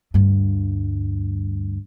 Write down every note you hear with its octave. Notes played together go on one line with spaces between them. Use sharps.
D2 G2